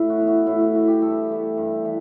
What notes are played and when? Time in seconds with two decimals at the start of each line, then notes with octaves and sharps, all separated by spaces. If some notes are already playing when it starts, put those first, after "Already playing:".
Already playing: A2 E4
0.10 F#4
0.19 E3 B3
0.27 F#4
0.46 A2 E4
0.60 E4
0.74 E3 B3 F#4
0.88 G4
1.01 G2 A4
1.29 E3 A3
1.57 G2
1.85 E3